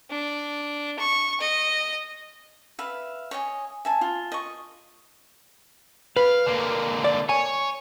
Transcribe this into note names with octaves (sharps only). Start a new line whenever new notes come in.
D4
C#6
D#5
B4 E5 F5
C#5 D#5 G#5
E5 G#5 A5
F4
D#5 C#6
B4 F5
D3 A#3
D5
C#5 G#5